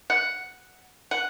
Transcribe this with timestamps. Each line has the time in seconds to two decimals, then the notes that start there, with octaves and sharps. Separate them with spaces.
0.10 F#5
1.11 F#5